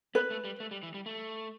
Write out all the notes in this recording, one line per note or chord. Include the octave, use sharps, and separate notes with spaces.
B3 B4
A3
G3
A3
G3
E3
G3
A3